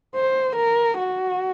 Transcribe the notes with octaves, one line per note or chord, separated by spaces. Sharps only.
C5
A#4
F#4